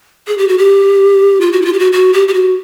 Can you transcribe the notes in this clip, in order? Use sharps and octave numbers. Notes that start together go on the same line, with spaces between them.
G#4
G4
F#4
G4
F4
F#4
E4
F4
G4
F#4
F#4
G4
G4
F#4